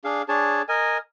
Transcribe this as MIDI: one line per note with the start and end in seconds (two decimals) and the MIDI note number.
0.04 0.22 62
0.04 0.22 68
0.04 0.22 77
0.28 0.62 62
0.28 0.62 68
0.28 0.62 73
0.28 0.62 81
0.69 0.98 70
0.69 0.98 75
0.69 0.98 80